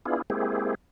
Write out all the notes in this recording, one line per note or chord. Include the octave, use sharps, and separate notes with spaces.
B3 D4 E4 F4 G#4
G#3 A#3 C4 E4 G4 G#4